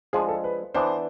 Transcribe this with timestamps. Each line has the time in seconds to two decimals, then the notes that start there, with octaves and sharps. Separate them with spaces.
0.13 F3 G#3 D4 G#4
0.29 A4
0.44 B4
0.74 E3 B3 D4 C5